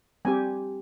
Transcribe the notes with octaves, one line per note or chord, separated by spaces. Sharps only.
G3 C4 G4 G#5